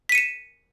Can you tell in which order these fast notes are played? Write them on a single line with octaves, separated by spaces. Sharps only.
B6 D#7 C#7 E7